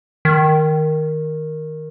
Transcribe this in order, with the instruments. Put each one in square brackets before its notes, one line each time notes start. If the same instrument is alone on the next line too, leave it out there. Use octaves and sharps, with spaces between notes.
[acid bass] D#3